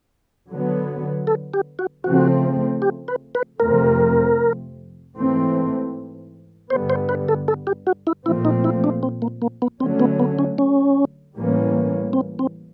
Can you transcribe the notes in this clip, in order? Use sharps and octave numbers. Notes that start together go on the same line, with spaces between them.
D3 F#3 B3
A4
G4
F#4
C#3 F3 A3 C4 F#4
G4
B4
B4
F2 C3 F3 A3 C4 A#4
G#2 E3 A3 C4
G2 D3 G3 B3 C5
C5
B4
A4
A4
G4
F#4
E4
A#2 F3 A3 C4 E4
D#4
E4
D4
C4
A#3
A#3
B3
D3 F#3 A3 C4 C#4
B3
B3
C#4
C#4
A2 E3 G3 A#3 C#4
C4
C4